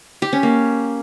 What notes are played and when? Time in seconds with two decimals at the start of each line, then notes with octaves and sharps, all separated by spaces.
0.22 G4
0.33 C#4
0.43 A#3